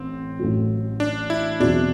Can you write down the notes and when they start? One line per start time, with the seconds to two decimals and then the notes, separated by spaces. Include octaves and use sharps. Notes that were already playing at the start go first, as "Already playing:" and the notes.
Already playing: A1 A2 C4
0.39 A1 A2 F#3
1.00 D4
1.30 E4
1.60 E2 B2 F#3 C4 D4 F#4